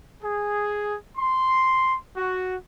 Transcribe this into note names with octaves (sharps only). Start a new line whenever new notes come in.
G#4
C6
F#4